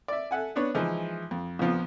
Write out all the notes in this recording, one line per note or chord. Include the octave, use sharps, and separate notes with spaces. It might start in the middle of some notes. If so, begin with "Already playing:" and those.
D5 E5
A4 E5 F#5 G#5
B3 D4 B4 C#5
E3 F3 G#3 D#4
F2
A#1 F2 F3 B3 F4